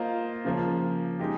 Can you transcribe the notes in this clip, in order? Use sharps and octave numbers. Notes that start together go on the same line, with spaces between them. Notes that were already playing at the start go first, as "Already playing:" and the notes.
Already playing: A#3 F4 C5 D#5
C#3 F3 A#3
G#3 D#4 G4